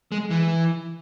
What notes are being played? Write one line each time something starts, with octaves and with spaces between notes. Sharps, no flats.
G#3
E3